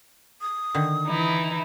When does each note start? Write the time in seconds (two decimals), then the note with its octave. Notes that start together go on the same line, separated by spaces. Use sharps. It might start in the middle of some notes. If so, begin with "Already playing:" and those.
0.41 D#6
0.75 D3 D#3
1.07 E3 D#4 E4